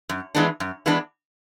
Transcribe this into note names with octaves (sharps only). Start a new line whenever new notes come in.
F#2
E3 G#3 B3 D4
F#2
E3 G#3 B3 D4